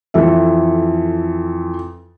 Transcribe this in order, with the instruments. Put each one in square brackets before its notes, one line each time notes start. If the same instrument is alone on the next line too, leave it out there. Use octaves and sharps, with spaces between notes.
[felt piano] F2 E3 A4 E5